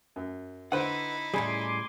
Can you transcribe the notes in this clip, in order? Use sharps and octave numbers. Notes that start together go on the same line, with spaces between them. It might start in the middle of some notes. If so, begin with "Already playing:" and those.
F#2
D3 D#4 E4 B4 C5 F#5
A2 C#3 G3 G#4 G#5 B5 C6 D6